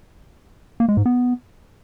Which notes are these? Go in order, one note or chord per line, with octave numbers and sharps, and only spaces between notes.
A#3
G#3
G#2
B3